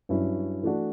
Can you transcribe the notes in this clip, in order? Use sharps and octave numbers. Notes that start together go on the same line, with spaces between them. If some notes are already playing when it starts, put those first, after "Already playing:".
G2 F#3 C#4 E4
E3 A3 D4 F#4